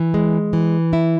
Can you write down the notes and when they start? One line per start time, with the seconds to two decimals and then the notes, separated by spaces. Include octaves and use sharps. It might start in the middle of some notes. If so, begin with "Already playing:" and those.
Already playing: E3
0.14 G#3
0.53 E3
0.93 E4